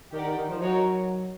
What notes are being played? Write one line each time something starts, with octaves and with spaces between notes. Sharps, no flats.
D#3 G4 A#4 D5 F#5
D#3
D#3
F3
F#3 D#4 F#4 A#4 C#5